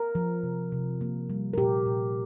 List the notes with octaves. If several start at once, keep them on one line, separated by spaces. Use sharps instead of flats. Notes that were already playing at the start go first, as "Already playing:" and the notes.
Already playing: A#4
F3
C3
C3
A#3
G3
A#4
A#2 G4
A#2